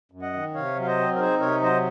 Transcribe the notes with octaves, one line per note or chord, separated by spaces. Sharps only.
F#2
D#5 F#5
D#3
C3 C#5 F5
F#3 F5
C5 D#5
C4
A#4
D#4 G#4 C5
C3 A#4 C#5
F#3 C5 D#5